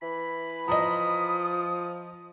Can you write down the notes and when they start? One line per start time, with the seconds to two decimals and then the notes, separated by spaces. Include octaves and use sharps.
0.02 E3 B5
0.68 F3 D#5 A#5 D#6